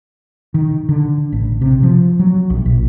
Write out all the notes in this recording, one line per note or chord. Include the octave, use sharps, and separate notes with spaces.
D#3
D3
A1
C3
F3
F#3
A#1
A#1